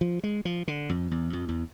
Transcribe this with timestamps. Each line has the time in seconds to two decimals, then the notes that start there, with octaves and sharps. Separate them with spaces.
0.01 F3
0.24 G#3
0.45 F3
0.68 D3
0.89 F2
1.11 E2
1.33 F2
1.49 E2